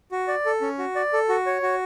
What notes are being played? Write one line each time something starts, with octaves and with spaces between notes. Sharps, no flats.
F#4
D5
A4
C#4
F#4
D5
A4
F#4
C#5
F#4